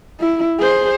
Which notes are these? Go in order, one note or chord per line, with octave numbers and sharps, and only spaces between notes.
E4
G#4 C5